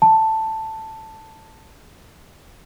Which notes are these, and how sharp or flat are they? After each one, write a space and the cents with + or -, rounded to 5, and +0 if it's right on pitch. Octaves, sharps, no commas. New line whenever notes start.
A5 +5